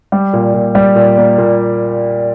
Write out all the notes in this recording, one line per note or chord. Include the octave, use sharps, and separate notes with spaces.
G3
A#2
A#2
G3
A#2
A#3
A#2